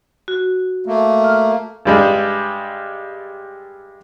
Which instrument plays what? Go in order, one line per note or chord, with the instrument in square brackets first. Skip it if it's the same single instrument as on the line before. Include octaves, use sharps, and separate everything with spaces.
[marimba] F#4
[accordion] A3 A#3
[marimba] F6
[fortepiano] G2 G3 G#3